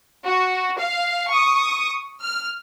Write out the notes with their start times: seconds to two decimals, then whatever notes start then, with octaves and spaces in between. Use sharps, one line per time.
0.22 F#4
0.76 F5
1.29 C#6 D#6
2.21 F6